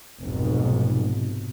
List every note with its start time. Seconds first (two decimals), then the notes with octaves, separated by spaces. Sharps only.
0.22 F1 B1 G#2